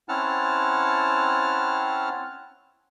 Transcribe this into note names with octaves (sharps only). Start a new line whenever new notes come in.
C4 C#4 E4 F#5 A5 F6